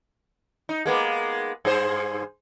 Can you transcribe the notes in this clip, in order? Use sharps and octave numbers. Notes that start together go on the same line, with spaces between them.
D#4
G#3 A#3 B3
G2 G#4 C5